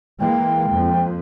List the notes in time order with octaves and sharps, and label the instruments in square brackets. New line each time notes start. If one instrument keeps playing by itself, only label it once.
[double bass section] E3 G#3 A#3 [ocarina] G5
[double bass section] F2